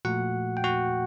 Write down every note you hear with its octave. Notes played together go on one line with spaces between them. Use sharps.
A#2 F3 A3 F#4 F#5
G5
F#4 F#5